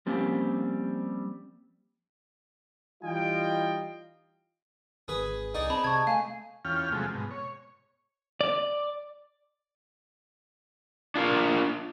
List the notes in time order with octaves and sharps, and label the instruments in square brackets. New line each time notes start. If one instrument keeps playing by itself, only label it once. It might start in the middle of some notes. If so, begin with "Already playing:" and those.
[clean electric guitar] F3 G3 A#3 C4 C#4 G4
[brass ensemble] E3 G3 D#4 F4 D#5 G5
[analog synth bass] G#1 [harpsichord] G#4 B4 B5
[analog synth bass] C2 [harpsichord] D#4 G#4 D5
[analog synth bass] C4 [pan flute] A5 [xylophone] B5
[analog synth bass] C3 [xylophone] C#6 G#6
[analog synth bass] A3 [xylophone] F5 [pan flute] G#5
[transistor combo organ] E2 C#4 F4 G5 F6
C3 F3 F#3 G#3 A3
G#2 B2
C#5
[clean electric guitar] D5
[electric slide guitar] D4 F4 A#4